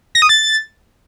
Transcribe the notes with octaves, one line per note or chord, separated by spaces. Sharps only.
A#6
D#6
A6